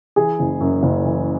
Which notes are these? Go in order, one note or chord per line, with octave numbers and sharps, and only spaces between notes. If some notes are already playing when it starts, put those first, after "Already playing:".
E3 G#4
F#1
F#2
F#1
E3